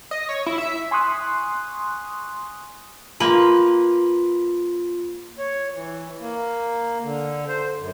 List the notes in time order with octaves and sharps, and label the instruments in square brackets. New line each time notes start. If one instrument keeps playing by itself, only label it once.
[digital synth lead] D#5
C#5
E4
E5
[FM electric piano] G#5 C6 C#6 D#6 F#6
[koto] A#3 B4 [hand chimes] F4 C6
[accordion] C#5
E3
A#3
D3
C5
F#2